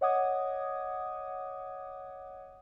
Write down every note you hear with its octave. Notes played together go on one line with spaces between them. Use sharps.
C#5 D#5 F#5 D6 D#6 G#6